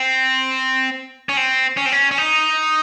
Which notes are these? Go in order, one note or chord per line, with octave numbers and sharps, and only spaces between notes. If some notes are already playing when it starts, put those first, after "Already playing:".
Already playing: C4
C#4
C4
C#4
C4
C#4
C#4
D#4